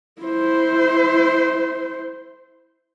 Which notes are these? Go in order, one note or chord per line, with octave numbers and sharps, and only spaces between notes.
E4 C5